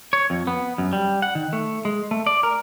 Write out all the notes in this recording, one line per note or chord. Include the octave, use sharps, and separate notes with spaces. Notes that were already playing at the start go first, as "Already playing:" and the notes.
C#5
F2
B3
F#2
G3
F#5
D#3
A3
G#3
A3
D5
A#4